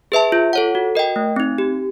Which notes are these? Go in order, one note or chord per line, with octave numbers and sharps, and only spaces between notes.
G#4 B4 E5 A5
F4
A4 C#5 F#5
F#4
A#4 D#5 G5
A3
C4 D#4
G4